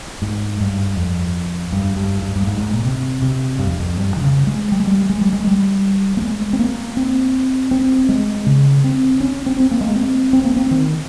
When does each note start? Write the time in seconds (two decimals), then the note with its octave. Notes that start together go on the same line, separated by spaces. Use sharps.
0.22 G#2
0.60 G2
0.97 F2
1.72 G2
1.96 G2
2.22 G2
2.36 G2
2.47 G#2
2.60 G#2
2.73 A#2
2.85 C3
3.22 C3
3.59 G2
3.67 F2
3.80 F2
3.97 G2
4.16 D#3
4.22 C#3
4.47 G#3
4.72 G3
4.80 G#3
4.87 G3
5.09 G#3
5.21 G3
5.33 G#3
5.47 G3
6.17 A#3
6.22 G#3
6.53 C4
6.59 A#3
6.97 C4
7.71 C4
8.09 G#3
8.46 C#3
8.84 C4
9.21 C#4
9.46 C4
9.60 C4
9.71 A#3
9.81 G#3
9.88 A#3
9.96 C4
10.33 C4
10.44 A#3
10.56 C4
10.71 D#3